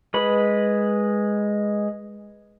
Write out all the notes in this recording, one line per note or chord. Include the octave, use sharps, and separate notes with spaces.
G#3 B4 B5